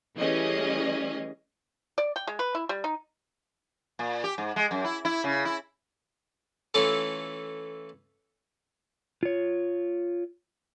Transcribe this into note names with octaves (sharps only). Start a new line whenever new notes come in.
E3 G3 A3 C#4 G#4 D#5
D5
G5
G#3
B4
E4
G3
D#4
A#2
G4
G#2
G#3
F#2
E4
E4
C#3
E4
E3 A3 C#4 F4 A4
F4 C#5